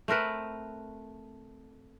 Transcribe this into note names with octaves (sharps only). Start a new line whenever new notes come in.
A3 C4 A#4 B4